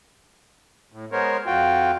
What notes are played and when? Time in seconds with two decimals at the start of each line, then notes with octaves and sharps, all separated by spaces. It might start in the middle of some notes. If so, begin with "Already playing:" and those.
0.92 A2
1.12 G#3 B3 A#4 C5 C#5
1.46 F2 F4 F#4 G5